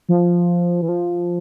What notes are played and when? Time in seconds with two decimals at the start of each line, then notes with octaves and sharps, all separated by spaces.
0.09 F3
0.82 E3
0.89 F3